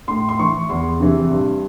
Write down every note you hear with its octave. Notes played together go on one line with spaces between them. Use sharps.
A2 C6
C6
E3 C#6
E2 C6
C3 E3
G2